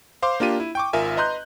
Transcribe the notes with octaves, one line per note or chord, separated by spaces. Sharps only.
C5 F5 C6 D6
A#3 D4 F4 G4 D#7
E4
G5 C#6 D6
G#1 F4 A#4 E5 G#5
B4 D#5 A#5 C6 F#6 G6